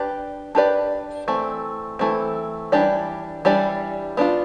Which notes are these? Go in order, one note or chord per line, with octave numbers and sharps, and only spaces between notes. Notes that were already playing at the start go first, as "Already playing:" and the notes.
Already playing: D4 G4 B4 D5
D4 G4 B4 D5
E3 A3 C4
E3 A3 C4
E3 G3 D4 G4 D5
E3 G3 D4 G4 D5
B3 D4 F4